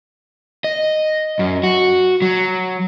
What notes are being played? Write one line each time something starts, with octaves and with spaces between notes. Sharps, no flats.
D#5
F#2
F#4
F#3